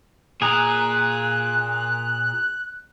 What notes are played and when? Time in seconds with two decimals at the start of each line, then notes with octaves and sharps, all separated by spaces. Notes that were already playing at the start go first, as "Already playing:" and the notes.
0.42 A#2 G#4 A#5 F#6